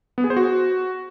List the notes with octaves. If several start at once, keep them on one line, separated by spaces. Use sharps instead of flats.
B3
G#4
C5
F#4